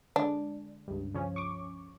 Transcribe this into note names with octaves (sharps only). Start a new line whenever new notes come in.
D3 G#3 D4
C#2 G2
C#3 F3 C#4
C#6 D6